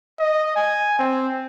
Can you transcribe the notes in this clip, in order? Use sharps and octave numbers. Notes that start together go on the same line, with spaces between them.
D#5
G#5
C4